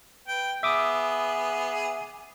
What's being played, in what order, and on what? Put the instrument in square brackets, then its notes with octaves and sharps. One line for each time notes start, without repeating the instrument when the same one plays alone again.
[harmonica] B4 G5
[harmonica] B3 G#4 [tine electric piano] E5 D6 D#6